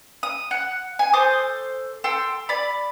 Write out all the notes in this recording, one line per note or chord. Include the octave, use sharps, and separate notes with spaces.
D#6
F#5
G#5
A4 C5 D6 D#6
A4 G5 C6
D5 B5